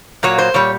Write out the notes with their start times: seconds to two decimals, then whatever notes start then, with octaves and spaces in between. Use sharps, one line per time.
0.23 A#2 F#3 A#3 C#5
0.38 C5
0.54 A#2 G3 C#5